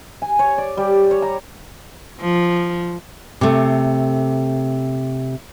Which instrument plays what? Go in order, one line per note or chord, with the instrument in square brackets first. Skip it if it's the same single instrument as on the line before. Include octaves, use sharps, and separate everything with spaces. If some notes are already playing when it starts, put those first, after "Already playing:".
[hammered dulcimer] G#5
C#5
D5
G3
C#5
A#5
[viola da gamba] F3
[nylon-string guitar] C3 A3